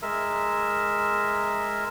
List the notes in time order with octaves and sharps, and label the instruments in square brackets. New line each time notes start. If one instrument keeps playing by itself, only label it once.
[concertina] G#3 A#4 E5